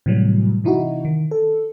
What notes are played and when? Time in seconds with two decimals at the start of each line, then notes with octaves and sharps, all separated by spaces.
0.06 A2 C3 E3 F#3 G3
0.64 C3 E3 D#4 E4 F#4
1.05 D#3
1.31 A4